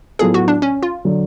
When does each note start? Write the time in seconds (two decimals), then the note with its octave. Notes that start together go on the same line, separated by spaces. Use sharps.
0.19 A2 F#3 B3 F4 G#4 A4
0.34 F#4
0.48 D4
0.62 C#4
0.83 F4
1.05 D3 F#3